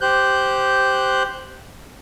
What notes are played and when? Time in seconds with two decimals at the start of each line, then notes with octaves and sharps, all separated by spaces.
0.01 G4 C5 F#6 G6